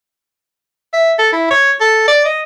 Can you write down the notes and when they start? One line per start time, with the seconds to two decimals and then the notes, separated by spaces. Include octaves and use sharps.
0.93 E5
1.19 A4
1.32 E4
1.51 C#5
1.80 A4
2.08 D5
2.25 D#5